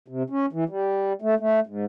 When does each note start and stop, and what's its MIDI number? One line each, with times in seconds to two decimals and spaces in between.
0.08 0.23 48
0.30 0.46 61
0.53 0.64 52
0.69 1.13 55
1.22 1.35 57
1.40 1.60 57
1.67 1.85 44